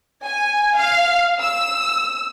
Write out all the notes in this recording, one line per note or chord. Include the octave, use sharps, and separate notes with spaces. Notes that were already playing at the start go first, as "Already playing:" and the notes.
G#5
F5
E6